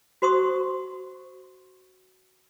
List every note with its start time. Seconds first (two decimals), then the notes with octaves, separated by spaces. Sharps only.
0.22 F#4 C5 C6 C#6 D#6